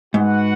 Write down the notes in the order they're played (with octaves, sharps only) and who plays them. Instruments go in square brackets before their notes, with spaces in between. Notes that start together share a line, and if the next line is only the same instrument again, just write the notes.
[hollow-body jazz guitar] G#2 [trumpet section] F#4 B4 F#5